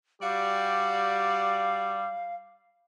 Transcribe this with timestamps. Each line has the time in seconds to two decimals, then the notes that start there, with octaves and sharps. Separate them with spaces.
0.22 G3 F#4 G4 D5 F5